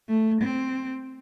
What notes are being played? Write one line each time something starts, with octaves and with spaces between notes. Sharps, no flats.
A3
C4